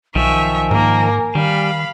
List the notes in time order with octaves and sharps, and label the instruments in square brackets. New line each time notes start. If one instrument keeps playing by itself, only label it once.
[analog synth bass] B1 [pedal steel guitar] D#3 F3 [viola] E5 C#6 [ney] G#5
[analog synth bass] G#2 [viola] A#3 A#4
[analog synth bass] D#3 [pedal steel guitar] G3 [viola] F5 B5